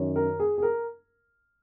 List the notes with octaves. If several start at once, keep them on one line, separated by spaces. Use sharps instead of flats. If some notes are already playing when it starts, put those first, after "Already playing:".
Already playing: F#2 D#3 C#4
A#4
G#4
G#4
A#4